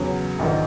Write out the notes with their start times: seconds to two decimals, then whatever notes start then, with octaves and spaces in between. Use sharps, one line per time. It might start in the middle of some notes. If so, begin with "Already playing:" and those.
Already playing: E2 C#3 F#3 C#5
0.39 A#1 G#2 D#3